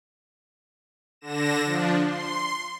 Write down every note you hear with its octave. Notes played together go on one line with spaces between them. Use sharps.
D3 A#6 E7
F3 D4
C6